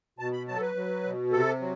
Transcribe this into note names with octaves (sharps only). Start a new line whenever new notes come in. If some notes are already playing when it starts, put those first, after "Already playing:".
B2 A5
B5
F#3 A5
A4
B4
F#3
B2
C3 A4
F#3